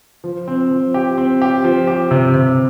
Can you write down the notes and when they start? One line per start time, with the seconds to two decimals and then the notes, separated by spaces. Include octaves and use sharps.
0.24 F3
0.48 C4
0.71 F3
0.94 G4
1.18 C4
1.42 G4
1.64 F3
1.87 G4
2.11 C3
2.34 C3